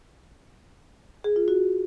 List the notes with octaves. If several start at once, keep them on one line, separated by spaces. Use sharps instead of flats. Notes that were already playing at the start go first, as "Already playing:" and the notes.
G#4
F4
F#4